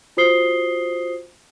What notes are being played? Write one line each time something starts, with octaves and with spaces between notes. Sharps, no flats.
F4 F#4 C5 D#6 C7 G7